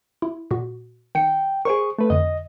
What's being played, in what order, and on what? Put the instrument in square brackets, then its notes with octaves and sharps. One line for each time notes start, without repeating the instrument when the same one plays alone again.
[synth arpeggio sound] E4
A#2 F#4
[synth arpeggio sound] D#3 C#7 [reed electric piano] G5
[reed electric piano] G#4 C#6 [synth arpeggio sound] A#4 C5 D7
[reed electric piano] A3 B4
[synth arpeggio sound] F2 D3 [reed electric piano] D#5